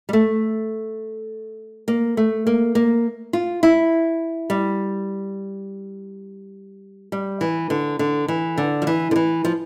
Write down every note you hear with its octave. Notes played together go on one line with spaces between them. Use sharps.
G3
A3
A#3
A3
A#3
A#3
F4
E4
G3
G3
E3
D3
D3
E3
D3
F3
E3
D3
E3
F3